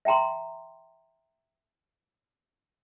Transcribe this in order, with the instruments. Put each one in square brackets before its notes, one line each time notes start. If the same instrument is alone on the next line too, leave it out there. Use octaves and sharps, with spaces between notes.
[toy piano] E5 G5 A#5 C6